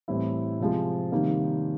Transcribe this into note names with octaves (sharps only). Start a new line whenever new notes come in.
A2 E3 G3 C4 E4
C3 F3 G#3
C3 D#3 G3 A#3